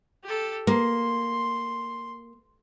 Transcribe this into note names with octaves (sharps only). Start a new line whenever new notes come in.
G4 A4
A#3 C6